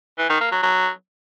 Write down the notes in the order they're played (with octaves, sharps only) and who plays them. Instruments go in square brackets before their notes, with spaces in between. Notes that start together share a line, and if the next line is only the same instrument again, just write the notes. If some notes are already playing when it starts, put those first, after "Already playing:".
[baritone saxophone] E3
D#3
A#3
F#3
F#3